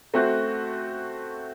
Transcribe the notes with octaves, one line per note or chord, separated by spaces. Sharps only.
A3 C4 F#4